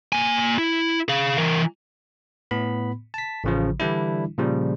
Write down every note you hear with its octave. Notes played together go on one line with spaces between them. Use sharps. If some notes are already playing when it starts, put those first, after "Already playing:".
A#3 G#5
E4
G#4 F5
E3 A#4
A2 B3 B5
A5 B6
A1 C#3 F3
D3 E3 G3 D4 E4
A#2 C#3 F3 G3